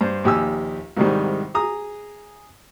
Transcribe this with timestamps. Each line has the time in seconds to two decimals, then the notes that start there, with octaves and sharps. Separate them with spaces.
0.01 G2 C5
0.24 A#1 D#2 G4 G#5 E6
0.97 C2 G#2 D#3 G3
1.54 G#4 A#5 D#6